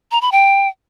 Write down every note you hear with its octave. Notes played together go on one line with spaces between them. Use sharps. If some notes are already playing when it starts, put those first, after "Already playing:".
A#5
B5
G5